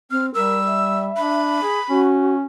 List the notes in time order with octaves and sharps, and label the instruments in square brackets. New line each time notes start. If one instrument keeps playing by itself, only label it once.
[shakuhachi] C4 [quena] F6
[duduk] G3 [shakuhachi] A#4 [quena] E6
[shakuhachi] E5
[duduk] D4 [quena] B5
[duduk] G#4
[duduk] C#4 [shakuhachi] F#4